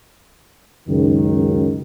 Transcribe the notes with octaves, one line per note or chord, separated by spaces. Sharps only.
C#2 F#2 D#3